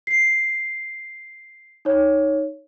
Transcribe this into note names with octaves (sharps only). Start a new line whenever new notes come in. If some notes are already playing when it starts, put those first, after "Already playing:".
C7
D#4 C#5